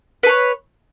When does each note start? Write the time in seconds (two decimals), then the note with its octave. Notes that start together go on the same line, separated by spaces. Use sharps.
0.23 B4
0.26 A4
0.29 C#5